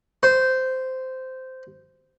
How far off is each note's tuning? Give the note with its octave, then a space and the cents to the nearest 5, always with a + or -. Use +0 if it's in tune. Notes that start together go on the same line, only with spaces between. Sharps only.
C5 -10